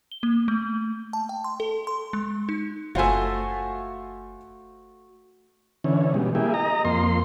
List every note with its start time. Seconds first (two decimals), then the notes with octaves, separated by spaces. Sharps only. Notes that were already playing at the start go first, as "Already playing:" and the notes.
0.12 G7
0.23 A#3
0.48 A3
1.13 A5
1.29 G5
1.44 C6
1.60 A4
1.87 C6
2.13 G#3
2.49 D#4
2.95 F#1 A3 F4 F#4 C5 G#5
5.84 D3 E3 C#4
6.14 B2 G3 G#3
6.35 A#3 E4 G4 G#4
6.54 D#5 A#5
6.85 F2 A#3 C6